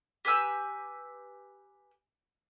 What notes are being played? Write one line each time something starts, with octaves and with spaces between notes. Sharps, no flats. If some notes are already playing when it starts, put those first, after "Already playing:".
G4 B4 G#5 E6